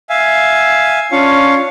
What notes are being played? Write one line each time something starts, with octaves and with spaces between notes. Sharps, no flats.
E5 F5 G#5
C#4 D4 F4 C#5 F5